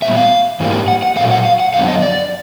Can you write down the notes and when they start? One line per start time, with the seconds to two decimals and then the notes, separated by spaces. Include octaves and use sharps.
0.02 A#2 G3 B3 E5
0.17 F5
0.60 G#2 E3 G3 A#3
0.88 F#5
1.02 F#5
1.16 A#2 F#3 A3 F5
1.31 F#5
1.45 F5
1.60 F#5
1.74 F2 D3 F#3 B3 F5
1.88 D#5
2.02 D5